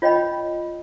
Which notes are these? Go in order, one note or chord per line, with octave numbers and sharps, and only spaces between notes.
F4 C#5 D#5 G5 B5